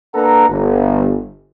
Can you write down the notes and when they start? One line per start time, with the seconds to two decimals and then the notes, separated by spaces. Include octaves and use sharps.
0.14 A#3 D4 A4 B4 F#5 A#5
0.49 G1